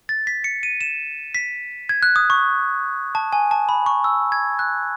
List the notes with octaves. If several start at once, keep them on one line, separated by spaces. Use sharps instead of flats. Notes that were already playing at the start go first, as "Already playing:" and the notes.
A6
B6
C#7
D#7
E7
B6
G#6
F#6
D#6
C#6
A5
G#5
A5
B5
C#6
E6
G#6
F#6